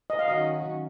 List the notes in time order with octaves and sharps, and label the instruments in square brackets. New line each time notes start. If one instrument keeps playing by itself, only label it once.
[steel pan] D#5
F5
[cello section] D#3 F#3 C#4 F#4 [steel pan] D#5